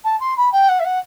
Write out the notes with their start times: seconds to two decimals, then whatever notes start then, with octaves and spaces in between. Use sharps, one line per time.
0.04 A5
0.20 C6
0.37 B5
0.52 G5
0.68 F#5
0.79 E5
0.84 F#5